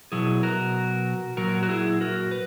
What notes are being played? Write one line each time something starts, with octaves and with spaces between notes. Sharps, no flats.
B2 F#3 E4 G#4
F#4 A#4
A#2 F#3 F#4 A#4
F#4
E4 G#4
F#4 A#4
B4